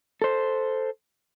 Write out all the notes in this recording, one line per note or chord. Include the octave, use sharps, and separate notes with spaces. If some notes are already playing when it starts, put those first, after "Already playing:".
A4 C5